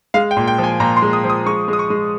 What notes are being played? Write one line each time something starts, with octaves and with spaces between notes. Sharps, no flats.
G#3 F5
G5
A#2
G5
F3
G#5
A#2 A#5
C6
G#3
D#6
F3
D#6
G#3 C#6
G#3
D#6
C#6
G#3